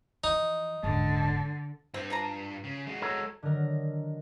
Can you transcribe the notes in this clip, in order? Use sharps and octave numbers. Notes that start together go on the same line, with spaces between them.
F2 E3 D#4
D#1 G#2 D3 A5
G2 C4
F3 A5 A#5
C#3
G#3 F#4
A4 C#5 A#5
D3 D#3 F#3 A#4